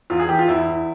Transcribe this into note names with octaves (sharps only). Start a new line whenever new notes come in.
E2 F4
G#4
E3 G4
F4
E2 E4
E2